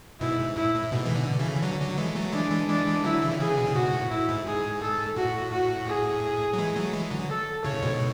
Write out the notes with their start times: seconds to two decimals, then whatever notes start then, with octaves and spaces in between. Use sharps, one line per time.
0.20 G#2 B2 E4
0.39 G#2
0.56 A2 E4
0.74 A2
0.92 G#2 B2
1.06 E3
1.15 B2 D3
1.39 C#3 E3
1.62 D3 F#3
1.80 D3 F#3
1.98 E3 G#3
2.16 F#3 A3
2.33 E3 G#3 D4
2.51 E3 G#3
2.68 E3 G#3 D4
2.86 E3 G#3
3.04 D3 F#3 E4
3.21 C#3 E3
3.31 D3
3.39 C#3 E3 G#4
3.57 B2 D3
3.67 C#3
3.75 G#2 B2 F#4
3.93 A2
4.10 A2 E4
4.29 G#2
4.46 G#2 G#4
4.82 A4
5.16 A2 F#4
5.52 F#4
5.87 G#4
6.53 F#3
6.58 E3 G#3
6.76 F#3 A3
6.93 E3 G#3
7.11 D3 F#3
7.29 A4
7.65 A2 C#3 C#5
7.82 G#2 B2